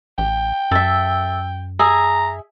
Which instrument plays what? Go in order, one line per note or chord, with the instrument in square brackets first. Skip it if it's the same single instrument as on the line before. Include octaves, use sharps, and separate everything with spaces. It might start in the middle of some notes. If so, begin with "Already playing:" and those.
[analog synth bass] A1 [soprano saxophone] G5
[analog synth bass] F#2 [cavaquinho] A4 E5
[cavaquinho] G#4 E5 G#5 [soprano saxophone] A#5